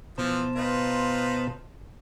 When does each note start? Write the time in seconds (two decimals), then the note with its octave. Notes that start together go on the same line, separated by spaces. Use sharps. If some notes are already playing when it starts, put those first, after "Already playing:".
0.18 B2 E3 F3 C5 A5
0.56 D#4 F4 B4